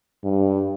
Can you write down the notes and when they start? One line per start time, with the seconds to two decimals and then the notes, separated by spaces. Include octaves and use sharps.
0.24 G2